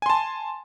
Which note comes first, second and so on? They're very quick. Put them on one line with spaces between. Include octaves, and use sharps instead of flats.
G#5 C6 A5